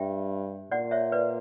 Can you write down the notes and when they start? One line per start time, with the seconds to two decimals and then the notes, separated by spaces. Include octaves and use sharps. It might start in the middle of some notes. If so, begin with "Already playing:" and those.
Already playing: G2 E5 G5
0.71 A#2 D5 F#5
0.91 C#5 E5
1.12 B4 D5